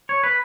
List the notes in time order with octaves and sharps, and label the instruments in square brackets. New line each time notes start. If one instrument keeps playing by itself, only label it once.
[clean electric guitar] C#5
B4